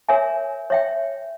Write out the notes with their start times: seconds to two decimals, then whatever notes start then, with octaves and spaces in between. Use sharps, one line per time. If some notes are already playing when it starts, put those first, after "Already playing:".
0.09 A#4 C#5 E5 G#5
0.70 C#5 E5 G5